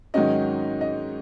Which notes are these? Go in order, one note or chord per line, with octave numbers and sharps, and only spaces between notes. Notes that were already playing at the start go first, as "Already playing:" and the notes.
G#2 D#3 F#3 C#4 D#5
D#5